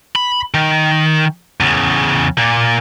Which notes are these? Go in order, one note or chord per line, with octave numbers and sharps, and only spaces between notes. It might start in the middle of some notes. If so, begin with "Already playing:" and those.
B5
D#3
E2 C#3
A#2 A#3